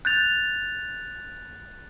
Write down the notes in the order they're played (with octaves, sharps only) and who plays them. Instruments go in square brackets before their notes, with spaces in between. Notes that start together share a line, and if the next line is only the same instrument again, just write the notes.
[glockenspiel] F#6 G6 A6 F7